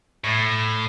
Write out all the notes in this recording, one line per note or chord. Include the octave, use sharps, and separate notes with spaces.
A2